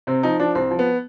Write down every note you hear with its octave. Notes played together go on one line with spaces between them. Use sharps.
C3 C4
F3 D#4
F3 D4
C2 C4
F3
B3